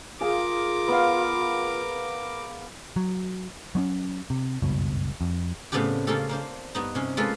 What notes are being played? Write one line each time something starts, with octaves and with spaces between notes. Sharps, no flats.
F4 G#4 A#4 F5 D6
B3 F5
F#3
F#3 C4 C#4
C3
F#1 C#2 G2 B2
F2
A2 C#3 B3 C4 D4 G4
C#3 A#3 C#4 F4 G4 A4
A#3 D4 C5
G2 B3 D#4
C3 C#4
G#3 A#3 F4 A4 B4